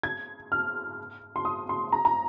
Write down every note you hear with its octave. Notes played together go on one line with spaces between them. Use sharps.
G#6
F6
C6
D#6
C6
A#5
A#5